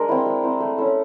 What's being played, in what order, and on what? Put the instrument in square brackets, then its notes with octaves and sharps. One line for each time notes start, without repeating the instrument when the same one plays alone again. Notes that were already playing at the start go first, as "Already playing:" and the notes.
Already playing: [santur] G#3 D4 A#4
C4 E4
G#3
C4 E4
A3
C#4 E4 A4